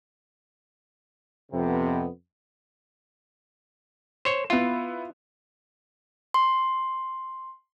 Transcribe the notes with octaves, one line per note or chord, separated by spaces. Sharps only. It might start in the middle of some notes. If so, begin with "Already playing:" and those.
F2 C3 B3
C5 C#5 E7
B3 E4 F4
C6